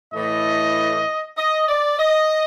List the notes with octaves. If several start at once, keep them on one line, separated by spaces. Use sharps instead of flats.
A2 E3 A3 D#5
D#5
D5
D#5